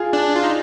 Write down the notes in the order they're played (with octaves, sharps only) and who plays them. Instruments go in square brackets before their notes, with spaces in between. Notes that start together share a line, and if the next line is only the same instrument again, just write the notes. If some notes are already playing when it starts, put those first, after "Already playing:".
Already playing: [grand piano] F4 G#4
[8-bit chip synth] D4
F4
D#4